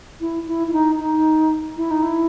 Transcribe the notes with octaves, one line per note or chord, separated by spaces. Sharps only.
E4
E4
E4
D#4
D#4
E4
D#4
E4